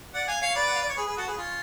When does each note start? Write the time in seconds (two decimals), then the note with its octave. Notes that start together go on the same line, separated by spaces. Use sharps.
0.14 D5 F#5
0.27 F5 G#5
0.41 C#5 F5
0.55 B4 D5
0.67 F#5
0.74 F5
0.82 D5
0.89 C#5
0.96 G#4 B4
1.07 G#4 B4
1.17 F#4 A4
1.27 G#4 B4
1.37 C#4 F4